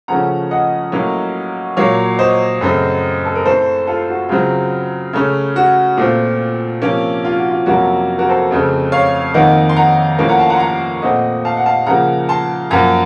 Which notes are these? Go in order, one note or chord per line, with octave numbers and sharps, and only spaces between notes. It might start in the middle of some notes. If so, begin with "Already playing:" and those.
C#3 F3 A3 C#4 F#5 A#5
D#5 F#5
A2 F#3 A#3 C#4
A#2 F#3 A#3 C#5 F5
C5 D#5
F#2 C#3 A3 C4
A4
A#4
A2 A3 C4 A4 C5
F4 A4
F#4
C#3 F#3 C4 F4
C#3 A3 C#4
F#4
A#2 A3 C4 F4
C3 F3 A#3 C#4
F4
F#4
F4
F2 C3 F#3 A#3 C#4 F#4
F#4 A#4
A4 C5
F2 C#3 A3 C4
C#5 F5
F2 D#3 A#3 D#5 F#5
C6
F#5 A#5
A2 F3 A#3 C#4
F#5 A#5
F5 A5
F#5 A#5
C6
F#5 A#5
A#2 A3 C4 D#5 F#5
F5 A5
F#5
F5 A5
C#3 F3 A#3 F#5 A#5
A5 C6
F#2 F3 A#3 F#5 A#5